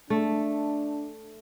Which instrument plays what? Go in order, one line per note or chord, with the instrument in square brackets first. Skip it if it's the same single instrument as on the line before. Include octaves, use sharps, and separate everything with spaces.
[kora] A3 [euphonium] D4